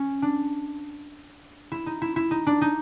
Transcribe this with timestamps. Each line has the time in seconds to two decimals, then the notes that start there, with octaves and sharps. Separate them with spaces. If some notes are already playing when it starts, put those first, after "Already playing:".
Already playing: C#4
0.22 D4
1.72 E4
1.86 D#4
2.02 E4
2.16 E4
2.31 D#4
2.47 D4
2.61 D#4